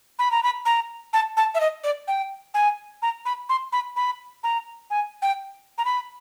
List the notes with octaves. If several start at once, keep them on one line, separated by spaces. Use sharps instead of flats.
B5
A#5
B5
A#5
A5
A5
E5
D#5
D5
G5
G#5
A#5
B5
C6
B5
B5
A#5
G#5
G5
A#5
B5